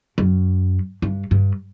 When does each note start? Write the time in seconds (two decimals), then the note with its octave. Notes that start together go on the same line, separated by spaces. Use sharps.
0.18 F#2
1.02 G2
1.31 G2